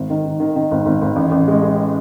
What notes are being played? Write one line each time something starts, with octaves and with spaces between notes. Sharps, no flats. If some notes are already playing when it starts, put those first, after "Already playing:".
Already playing: G#1
D#3
D#3
D#3
D#3
G#1
G#1
G#1
A1
A1
G#3
G#3